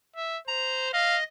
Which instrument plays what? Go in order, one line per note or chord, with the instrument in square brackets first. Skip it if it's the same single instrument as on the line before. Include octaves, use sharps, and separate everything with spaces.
[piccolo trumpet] E5
[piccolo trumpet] C5 [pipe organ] A#5
[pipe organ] D#5 [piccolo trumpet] F5